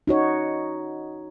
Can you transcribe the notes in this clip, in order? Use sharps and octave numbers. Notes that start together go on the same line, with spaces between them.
D#4 F#4 C#5